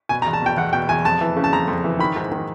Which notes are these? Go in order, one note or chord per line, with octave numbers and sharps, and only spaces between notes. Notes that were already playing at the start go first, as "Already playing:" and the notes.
B2 G#5
A#5
E2
A5
B2 G5
E2 F#5
B2 G5
E2 G#5
F2 A5
E3
C#3
A5
F2 A#5
F2
E3
D#3 B5
G#2
D#3